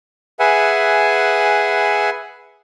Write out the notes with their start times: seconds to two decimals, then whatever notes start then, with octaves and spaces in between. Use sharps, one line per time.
0.40 G#4 B4 E5 F#5 G#5